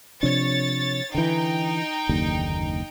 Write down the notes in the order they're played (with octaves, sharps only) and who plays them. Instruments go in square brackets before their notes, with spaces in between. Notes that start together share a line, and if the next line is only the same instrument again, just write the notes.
[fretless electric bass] C3 F3 D4 [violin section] C#5 A6
[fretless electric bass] D3 E3 [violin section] D#4 G5
[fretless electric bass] F#1 D#2 D3